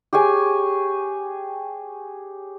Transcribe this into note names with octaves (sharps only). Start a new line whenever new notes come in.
G4 G#4 C#5 G#5